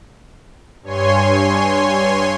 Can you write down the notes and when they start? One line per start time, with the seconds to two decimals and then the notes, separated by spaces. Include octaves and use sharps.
0.83 G2 C#5 G#5 C6